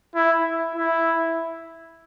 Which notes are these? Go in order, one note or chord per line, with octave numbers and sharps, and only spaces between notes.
E4
E4